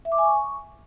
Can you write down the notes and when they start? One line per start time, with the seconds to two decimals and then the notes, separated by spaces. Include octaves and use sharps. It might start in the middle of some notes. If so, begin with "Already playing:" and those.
0.05 E5
0.12 D6
0.18 G#5
0.25 C#6